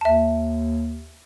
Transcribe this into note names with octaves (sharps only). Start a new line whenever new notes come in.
D#2 E5 A5